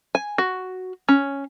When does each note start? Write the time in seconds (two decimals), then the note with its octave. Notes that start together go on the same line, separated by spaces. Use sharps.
0.15 G#5
0.38 F#4
1.09 C#4